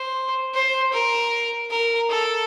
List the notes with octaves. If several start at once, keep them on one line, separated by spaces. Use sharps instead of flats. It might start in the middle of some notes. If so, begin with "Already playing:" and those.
Already playing: C5
C5
A#4
A#4
A4